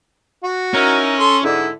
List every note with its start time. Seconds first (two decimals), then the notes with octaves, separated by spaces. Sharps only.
0.43 F#4
0.74 C#4 D#4 E4 A#4
1.19 A4 C6
1.43 G#2 D3 E4